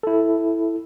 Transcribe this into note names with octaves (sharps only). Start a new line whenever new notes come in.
E4 A4